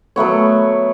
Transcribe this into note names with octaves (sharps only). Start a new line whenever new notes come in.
F#3 A3 B3 C#5